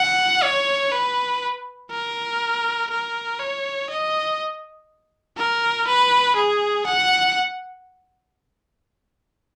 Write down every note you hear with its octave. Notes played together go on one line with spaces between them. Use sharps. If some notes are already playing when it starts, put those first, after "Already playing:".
Already playing: F#5
C#5
B4
A#4
A#4
C#5
D#5
A#4
B4
G#4
F#5